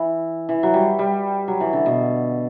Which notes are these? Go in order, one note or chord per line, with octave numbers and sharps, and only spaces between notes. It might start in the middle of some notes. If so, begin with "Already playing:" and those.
Already playing: E3
E3
F#3
G3
G3
F#3
E3
D3
B2